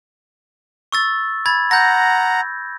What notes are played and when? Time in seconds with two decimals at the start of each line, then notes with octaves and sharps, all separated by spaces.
0.92 C#6 E6 A6
1.46 B5 G#6 A6
1.71 F#5 A#5 G6 A#6